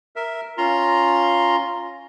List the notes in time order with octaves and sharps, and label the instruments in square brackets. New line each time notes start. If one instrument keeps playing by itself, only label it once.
[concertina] A#4 E5
C#4 F4 A#5 C6